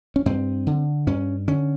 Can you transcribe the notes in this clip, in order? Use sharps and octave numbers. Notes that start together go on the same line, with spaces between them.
C#4
G2 C4
D3
G2 C#4
D3 C#4